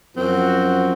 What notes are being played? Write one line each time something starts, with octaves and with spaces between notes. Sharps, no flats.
F#2 F3 C4 F#4